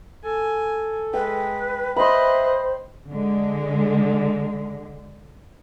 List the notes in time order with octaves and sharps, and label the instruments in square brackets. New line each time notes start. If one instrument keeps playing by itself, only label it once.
[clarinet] A4 [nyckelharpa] G#5
[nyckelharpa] G#3 [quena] B4 [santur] G5
[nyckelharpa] B4 D#5 [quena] C5 [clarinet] E5 [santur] B5 C6
[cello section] D3 G#3